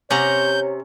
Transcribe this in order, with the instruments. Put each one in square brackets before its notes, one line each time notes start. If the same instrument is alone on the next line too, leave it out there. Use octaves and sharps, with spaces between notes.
[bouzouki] C3 [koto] C#4 F#5 A#5 [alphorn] C#5 [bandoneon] G6